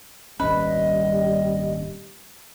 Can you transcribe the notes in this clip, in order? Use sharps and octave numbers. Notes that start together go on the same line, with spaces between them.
D#1 G#1 G3 C#4 B4 D#5